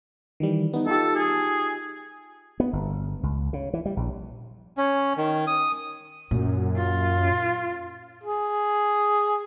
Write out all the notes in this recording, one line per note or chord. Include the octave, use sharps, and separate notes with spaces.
D#3 E3 G3
B3 D#4
D#4 F4 G4 A4
G#4
B3
G1
C#2
C#3
E3
G3
A#1
C#4
D#3
D#6
F#2 A#2
F4
G#4